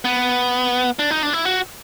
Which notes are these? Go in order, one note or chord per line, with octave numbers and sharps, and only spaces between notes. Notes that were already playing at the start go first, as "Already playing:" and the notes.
B3
D4
D#4
D4
E4
F#4